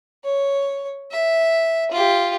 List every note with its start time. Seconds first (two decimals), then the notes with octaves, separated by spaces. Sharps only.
0.24 C#5
1.11 E5
1.91 F4 G4